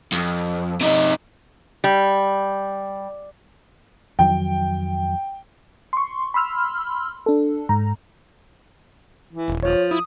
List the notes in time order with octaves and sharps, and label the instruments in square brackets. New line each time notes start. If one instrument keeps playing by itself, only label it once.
[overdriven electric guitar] F2
C3 D#4
[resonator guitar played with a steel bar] G3
[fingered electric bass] F2 D#3 F#3 [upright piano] G5
[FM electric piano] C6 C#6
B5 C6 E6 F6
D4 A4
G#2 A#5
[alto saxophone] E3
[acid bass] D#1
[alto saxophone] F3 [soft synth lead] C#5
[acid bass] E4 [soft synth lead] D#6